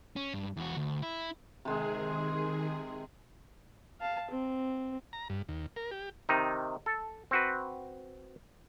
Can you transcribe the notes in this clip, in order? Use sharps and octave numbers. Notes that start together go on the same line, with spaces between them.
C#4
G2
E2 F#4
D2
E4
C3 D#3 G#3 C4 G#4
F5 A5
C4
A#5
G2
D#2
A#4
G4
C3 D#3 D#4
A4
C4 F#4 B4